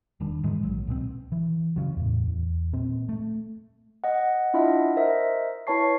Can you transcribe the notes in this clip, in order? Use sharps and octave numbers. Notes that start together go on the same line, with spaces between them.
E1 D#3 G3 D4
G#2 D#3 E3 G#3
A#1 F#3
C#2 B2 G#3 C4
E3
C#3 F#3
E2 A2
E2
A#2 C4
A3
D#5 F#5
D4 E4 F4 D#5 E5 F#5
A#4 C5 D#5 E5
E4 B4 C#5 A5 C#6 C7